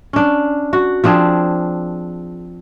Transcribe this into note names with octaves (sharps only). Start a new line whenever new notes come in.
C#4 D4
F#4
F3 C4 D4 G#4